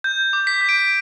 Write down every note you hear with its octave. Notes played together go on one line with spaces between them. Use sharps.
G6
D6
B6
G6
D7